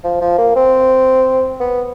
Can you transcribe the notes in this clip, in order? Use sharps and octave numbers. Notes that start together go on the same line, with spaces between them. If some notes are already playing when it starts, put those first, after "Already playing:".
F3
F3
A#3
C4
B3